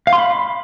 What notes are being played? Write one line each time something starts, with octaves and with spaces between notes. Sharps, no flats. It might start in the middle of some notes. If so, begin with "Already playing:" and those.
F5
C6
B5